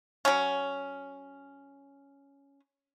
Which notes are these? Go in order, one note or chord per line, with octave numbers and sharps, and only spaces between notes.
F#3 C#4